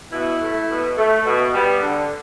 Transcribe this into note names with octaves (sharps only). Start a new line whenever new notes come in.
B2 E4
A3
B2
A3
B2
G3 B3
D3